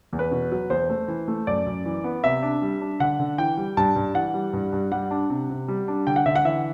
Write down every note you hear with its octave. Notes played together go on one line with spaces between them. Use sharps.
E2
B4
B2
F#3
E2 C5
A3
E3
A3
F#2 D5
F#2
E3
B3
C3 E5
D4
G3
D4
D3 F#5
D3
E3 G5
G3
G2 A5
G2
E3 F#5
G3
G2
G2
G3 F#5
D4
C3
C3
G3
D4
D3 G5
F#5
D3 E5
F#5
E3 E5